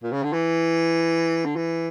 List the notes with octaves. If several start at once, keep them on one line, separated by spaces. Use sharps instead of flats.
A#2
C#3
D3
E3
D3
E3